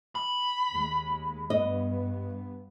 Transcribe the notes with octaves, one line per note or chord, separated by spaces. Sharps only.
B5
D#2 G#3
G2 B3 D#5